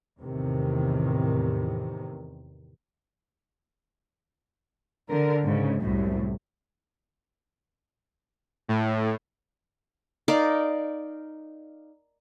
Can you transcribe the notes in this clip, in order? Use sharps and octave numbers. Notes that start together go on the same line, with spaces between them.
E2 A2 C3 D#3
D3 A#4
G#2 C#3
C2 F#2 A2
A2
D#4 A#4 D5 F5